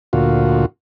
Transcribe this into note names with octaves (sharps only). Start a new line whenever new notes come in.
D2 A#2 F4 F#4